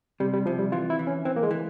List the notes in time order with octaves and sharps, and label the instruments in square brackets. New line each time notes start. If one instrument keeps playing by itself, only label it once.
[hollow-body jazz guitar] C3 [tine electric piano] G3
[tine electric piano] G3
[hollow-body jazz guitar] C3 [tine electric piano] F3
[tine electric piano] G3
[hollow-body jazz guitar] E3 [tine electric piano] F4
[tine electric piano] E4
[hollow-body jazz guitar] E3
[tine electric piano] C#4
[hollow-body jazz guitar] E3 [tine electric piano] C4
[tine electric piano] A#3
G#3
[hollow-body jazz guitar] E3